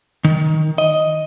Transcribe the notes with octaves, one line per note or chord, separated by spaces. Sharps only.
D#3
D#5